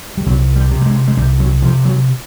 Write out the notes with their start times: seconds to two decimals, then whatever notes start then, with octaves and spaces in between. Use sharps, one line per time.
0.17 G3
0.26 C2 F#3
0.56 G3
0.71 C3
0.81 G3
0.86 G#3
1.08 G#3
1.17 C2 G3
1.40 F#3
1.62 C3 F3
1.85 F#3